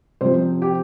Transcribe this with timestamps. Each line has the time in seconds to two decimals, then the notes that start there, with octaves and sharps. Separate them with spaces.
0.21 C3 F3 C5
0.62 G4